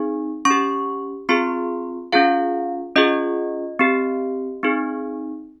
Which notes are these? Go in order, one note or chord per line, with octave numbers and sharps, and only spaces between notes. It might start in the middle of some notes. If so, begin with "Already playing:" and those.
Already playing: C4 D#4 G#4
C#4 C#6
G4
C4 F4 G#4 C6
C#4 F4 G#4 F5
C#4 F4 G#4 D#5
C4 G4
C4 D#4 G#4